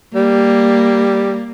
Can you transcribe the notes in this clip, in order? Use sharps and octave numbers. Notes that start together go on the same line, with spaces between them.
G3 A#3